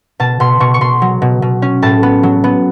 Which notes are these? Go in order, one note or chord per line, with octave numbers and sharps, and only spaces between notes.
B2 A5
B2 C6
B2 C#6
C#6
B2 C6
F#3
B2
B2
C#4
A2 A5
B3
F#3
B3